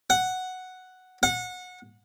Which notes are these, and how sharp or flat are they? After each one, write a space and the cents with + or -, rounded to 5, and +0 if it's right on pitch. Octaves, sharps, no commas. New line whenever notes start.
F#5 +0
F#5 -25